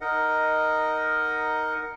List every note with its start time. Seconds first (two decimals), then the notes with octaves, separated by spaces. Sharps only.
0.01 D#4 A#4 D#5 F#5